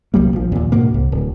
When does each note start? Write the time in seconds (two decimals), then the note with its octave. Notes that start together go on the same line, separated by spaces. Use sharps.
0.14 C2 F#3 G3 A#3
0.33 A#1 F3
0.52 D#2 A#2
0.72 D2 G#2 B2 A#3
0.94 C2
1.12 D1